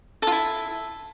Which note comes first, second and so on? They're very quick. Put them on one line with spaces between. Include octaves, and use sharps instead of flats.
A4 F4 E4